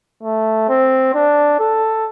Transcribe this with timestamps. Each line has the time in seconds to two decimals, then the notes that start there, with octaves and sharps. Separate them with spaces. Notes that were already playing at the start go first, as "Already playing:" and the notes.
0.23 A3
0.69 C4
1.14 D4
1.60 A4